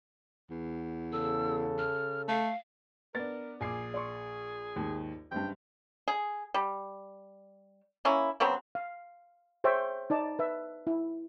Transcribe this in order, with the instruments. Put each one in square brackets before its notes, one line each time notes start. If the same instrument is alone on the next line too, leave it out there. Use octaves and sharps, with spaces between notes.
[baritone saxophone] E2
[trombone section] C#3 A4 [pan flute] E6
[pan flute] F6
[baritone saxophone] A3 [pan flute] F5
[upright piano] B3 D4 [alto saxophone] A#4 [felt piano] A6
[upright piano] A#1 C7 [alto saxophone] G#4 [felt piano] G#5 D6
[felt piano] D5 C6 C#6
D#2 G#2
[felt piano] F#1 G2 [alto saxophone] G5
[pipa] G#4
G3
A#3 C#4 E4
C#3 F#3 B3 C4
[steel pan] F5
G#4 C5 C#5 E5 G5
D#4 D5 A5
B4 E5
E4